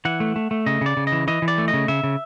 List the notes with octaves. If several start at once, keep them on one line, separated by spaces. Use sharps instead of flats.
E3 F#5
A3
A3
A3
C#3 D#5
C#3 D5
C#3
D#5
E3
E3 D#5
E3
D5
A3
D#5
C#3
C#3 E5
C#3